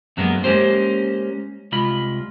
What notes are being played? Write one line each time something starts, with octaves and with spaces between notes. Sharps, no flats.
F#2 F#3 G#3 A#3 B3
G#3 A#3 C#4 G4 C5
C2 G#3 F4 B5